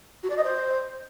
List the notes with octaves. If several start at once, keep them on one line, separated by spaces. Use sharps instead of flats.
F#4
D5
D#5
C5